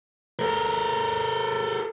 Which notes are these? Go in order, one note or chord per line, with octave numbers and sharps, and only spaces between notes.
A4 A#4